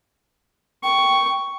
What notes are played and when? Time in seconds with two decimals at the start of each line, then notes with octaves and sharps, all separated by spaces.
0.83 G5 C#6